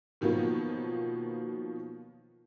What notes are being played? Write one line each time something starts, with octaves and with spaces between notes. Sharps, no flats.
B2 D#3 F3 F#3 A#3 B3